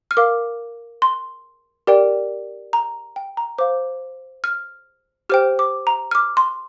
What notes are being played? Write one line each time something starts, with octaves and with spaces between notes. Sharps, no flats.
F6
A#4 F5 D6
C6
G4 A#4 D5 G5
A#5
G5
A#5
C5 F5 D6
F6
G4 C5 G5 F6
D6
A#5
F6
D6
C6